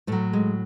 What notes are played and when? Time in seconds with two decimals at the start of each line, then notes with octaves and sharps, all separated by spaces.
0.07 A2 F#3 A3
0.33 G#3